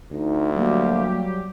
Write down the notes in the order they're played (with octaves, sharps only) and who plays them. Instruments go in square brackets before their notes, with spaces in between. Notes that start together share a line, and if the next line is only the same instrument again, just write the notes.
[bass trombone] D2 [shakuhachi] D#4
[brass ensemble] F#3 G3 G4 [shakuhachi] A#3